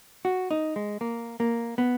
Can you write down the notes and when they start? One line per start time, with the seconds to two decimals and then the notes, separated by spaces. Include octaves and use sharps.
0.25 F#4
0.51 D#4
0.76 G#3
1.01 A#3
1.40 A#3
1.78 B3